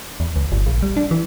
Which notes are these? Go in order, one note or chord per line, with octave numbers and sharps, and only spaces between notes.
E2
C#2
G1
A#1
G3
D4
E3